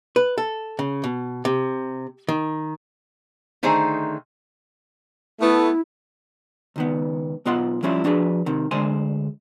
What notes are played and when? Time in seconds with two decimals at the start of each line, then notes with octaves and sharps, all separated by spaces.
0.16 B4
0.38 A4
0.79 C#3
1.04 B2
1.45 C3
2.29 D#3
3.63 D3 D#3 A3 D#4 G#4 C5
5.41 A3 B3 E4
6.76 C#2 D#3 B3
7.45 B1 B3 F4 D#5 F#5 C6
7.83 F3 G3 C#4 E4 F4
8.04 F3 D4 F#4 G#4 B4
8.46 C3 D#3
8.71 D2 D3 G#3 C5 G#5 C6